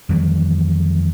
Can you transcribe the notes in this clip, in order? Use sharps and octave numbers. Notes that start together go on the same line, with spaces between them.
F2 D#3 E3 G3